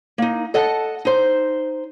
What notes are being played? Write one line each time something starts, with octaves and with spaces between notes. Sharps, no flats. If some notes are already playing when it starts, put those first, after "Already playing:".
A#3 D#4
A4 D#5 F#5 A5
D#4 C5